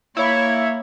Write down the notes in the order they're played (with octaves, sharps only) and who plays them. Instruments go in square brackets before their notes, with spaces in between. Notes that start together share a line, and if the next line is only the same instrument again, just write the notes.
[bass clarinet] A#3 [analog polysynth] E4 [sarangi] C#5